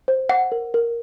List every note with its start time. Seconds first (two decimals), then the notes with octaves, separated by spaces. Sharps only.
0.08 C5
0.29 F#5
0.52 A#4
0.74 A#4